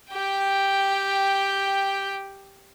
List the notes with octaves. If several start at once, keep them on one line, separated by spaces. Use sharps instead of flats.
G4 G5